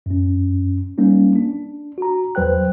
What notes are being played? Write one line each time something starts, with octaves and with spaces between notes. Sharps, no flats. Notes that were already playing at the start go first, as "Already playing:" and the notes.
F#2 C#4
G3 A#3 C#4 D#4
D4
F#4 A#5
E2 F#3 B4 C5 G5 F#6